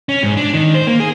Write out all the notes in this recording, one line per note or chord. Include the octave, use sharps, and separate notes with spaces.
C#4
G#2
D4
D#3
C5
A#3
G#4